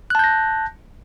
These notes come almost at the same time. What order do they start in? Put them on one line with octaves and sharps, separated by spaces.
F#6 A5 G6 A#6